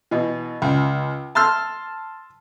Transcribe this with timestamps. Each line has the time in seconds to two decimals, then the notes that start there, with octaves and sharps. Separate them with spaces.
0.11 B2 E3
0.62 C#2
1.35 A5 C6 E6 F6